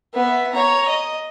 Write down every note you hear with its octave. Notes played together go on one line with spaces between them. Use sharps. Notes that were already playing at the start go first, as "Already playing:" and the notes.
B3 E5
C#5 A#5
D#5